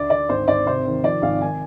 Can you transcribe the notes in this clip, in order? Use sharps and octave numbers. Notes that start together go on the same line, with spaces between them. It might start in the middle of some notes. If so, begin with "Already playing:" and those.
Already playing: D2 D5
D2 D5
G#1 C5
G#1 D5
C3 C5
D#3
F3 D5
G#1 F5
D#3 G#5